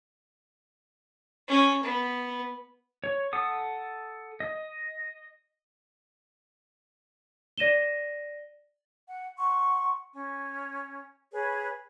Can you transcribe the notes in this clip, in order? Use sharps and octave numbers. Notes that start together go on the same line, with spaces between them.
C#4
B3
C#5
A4 F#5 D#6
D#5
D5 A#6 D#7 E7 G7
F#5
F#5 C6 C#6
C#4
G#4 B4 C#5